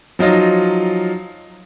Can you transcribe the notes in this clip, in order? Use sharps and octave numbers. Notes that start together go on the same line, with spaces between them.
F3 F#3 D#4 F4